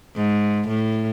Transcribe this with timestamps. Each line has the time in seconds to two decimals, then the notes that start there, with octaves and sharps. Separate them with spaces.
0.16 G#2
0.68 A2